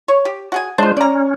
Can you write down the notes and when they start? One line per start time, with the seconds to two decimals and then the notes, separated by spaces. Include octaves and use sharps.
0.08 C#5
0.25 G4
0.52 F#4 G#4 G#5
0.78 G#3 D4 F4 C5
0.97 C#4 D5 A#5